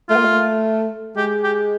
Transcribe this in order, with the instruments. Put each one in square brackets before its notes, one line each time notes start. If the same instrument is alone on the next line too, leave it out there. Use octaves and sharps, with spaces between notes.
[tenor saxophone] A3 [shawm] F4
[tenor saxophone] A#3
A3
[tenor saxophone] G#3 [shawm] G4
[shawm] G4